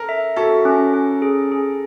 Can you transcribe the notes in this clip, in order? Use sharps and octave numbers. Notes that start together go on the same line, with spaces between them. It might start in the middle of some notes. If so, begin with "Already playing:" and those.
Already playing: A4 A#4
E5
F#4 A4
C#4
C#4
G#4
G#4